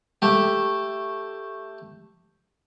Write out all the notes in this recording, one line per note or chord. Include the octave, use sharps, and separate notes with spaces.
A3 G4